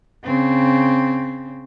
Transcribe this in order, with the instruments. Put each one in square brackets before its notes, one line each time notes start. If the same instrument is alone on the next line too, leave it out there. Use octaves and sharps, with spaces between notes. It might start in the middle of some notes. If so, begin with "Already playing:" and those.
[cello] C#3 C4